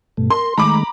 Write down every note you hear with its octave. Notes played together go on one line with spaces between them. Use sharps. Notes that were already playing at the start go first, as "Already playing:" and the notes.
G2 B2 A3
A#4 C6
D#3 G#3 A3 A#5 B5 D6